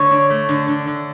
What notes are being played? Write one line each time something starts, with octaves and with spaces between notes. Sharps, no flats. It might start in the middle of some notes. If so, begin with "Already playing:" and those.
Already playing: D3 C#5
D4
A3
D3
D3
D3